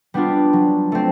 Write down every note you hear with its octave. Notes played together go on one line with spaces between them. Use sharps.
G3 B3 D4 F4
F#3
A3 C4